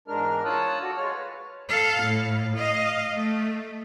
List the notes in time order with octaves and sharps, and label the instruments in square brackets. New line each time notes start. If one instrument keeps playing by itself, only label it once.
[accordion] E2 G#2 G#3 D4 A#4 F6
F4 C#5 A5 D#6 E6 F#6
F#4 A4 D5
G#3 F4 C#5 F6
B4
[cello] A4 F5
A2
D#5 F5
A3